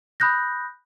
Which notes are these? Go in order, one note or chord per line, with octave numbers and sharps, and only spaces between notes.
B5 D#6 F#6 G6 A#6